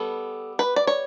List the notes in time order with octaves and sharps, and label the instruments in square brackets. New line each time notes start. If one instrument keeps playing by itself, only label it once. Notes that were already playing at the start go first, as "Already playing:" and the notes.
Already playing: [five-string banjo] G3 B3 A4
B4
D5
C#5